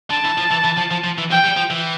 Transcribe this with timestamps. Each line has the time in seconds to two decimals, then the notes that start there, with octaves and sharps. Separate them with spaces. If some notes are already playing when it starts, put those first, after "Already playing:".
0.10 D3 A5
0.25 E3
0.38 F3
0.51 E3
0.64 E3
0.78 F3
0.91 F3
1.04 F3
1.18 E3
1.31 F3 G5
1.44 G3
1.57 F3
1.71 E3